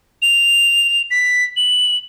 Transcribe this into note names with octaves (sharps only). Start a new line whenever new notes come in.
F7
B6
F#7